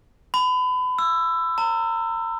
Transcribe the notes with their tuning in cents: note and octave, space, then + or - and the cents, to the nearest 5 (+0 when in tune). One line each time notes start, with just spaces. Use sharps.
B5 +30
E6 +15
A#5 -30